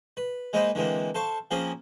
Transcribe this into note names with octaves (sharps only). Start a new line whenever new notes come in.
B4
G#3 A#3 D#4 B4 C5 D#5
D3 E3 G#3 A#3 C4
A4 C5 F5 A5 C#6
F3 A#3 C4 C#4 G#4 A#4